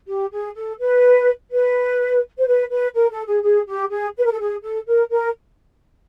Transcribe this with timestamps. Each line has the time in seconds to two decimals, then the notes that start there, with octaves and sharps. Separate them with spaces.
0.08 G4
0.32 G#4
0.55 A4
0.79 B4
1.52 B4
2.38 C5
2.47 B4
2.71 B4
2.95 A#4
3.11 A4
3.27 G#4
3.43 G#4
3.67 G4
3.91 G#4
4.17 B4
4.24 A#4
4.31 A4
4.38 G#4
4.62 A4
4.86 A#4
5.11 A#4